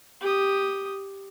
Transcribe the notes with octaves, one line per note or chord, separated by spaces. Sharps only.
G4 D#6